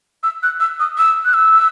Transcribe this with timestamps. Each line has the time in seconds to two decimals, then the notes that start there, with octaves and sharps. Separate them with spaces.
0.23 E6
0.43 F#6
0.60 E6
0.80 D#6
0.98 E6
1.25 F#6
1.34 E6